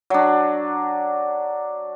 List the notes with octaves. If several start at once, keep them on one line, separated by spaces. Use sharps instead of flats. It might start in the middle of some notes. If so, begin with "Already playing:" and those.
F#3 D4